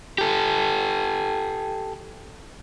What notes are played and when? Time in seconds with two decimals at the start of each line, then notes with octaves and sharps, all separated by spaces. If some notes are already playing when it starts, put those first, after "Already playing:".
0.18 G4 A4